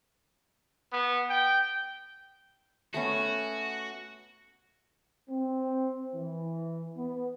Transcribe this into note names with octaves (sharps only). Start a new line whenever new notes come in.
B3
G5
A3 B3 C#4 F#4
C4
E3
B3